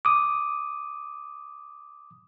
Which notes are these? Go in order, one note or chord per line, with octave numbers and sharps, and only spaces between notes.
D6 D#6